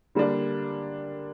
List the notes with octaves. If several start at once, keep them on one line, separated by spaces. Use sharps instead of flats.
D3 G3 A#3 D4